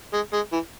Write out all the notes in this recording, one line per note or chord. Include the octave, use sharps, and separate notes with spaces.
G#3
G#3
E3